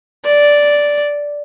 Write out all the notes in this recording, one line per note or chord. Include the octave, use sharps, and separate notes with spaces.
D5